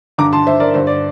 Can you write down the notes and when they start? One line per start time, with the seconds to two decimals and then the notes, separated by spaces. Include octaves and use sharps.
0.18 G2 D3 A#5 D6
0.33 A5 C6
0.47 C5 E5
0.60 A#4 D5
0.74 G2 D3 C5
0.87 D5